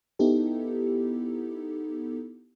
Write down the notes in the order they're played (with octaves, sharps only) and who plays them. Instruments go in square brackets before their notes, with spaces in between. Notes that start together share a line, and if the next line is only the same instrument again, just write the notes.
[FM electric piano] B3 D#4 E4 G4 A4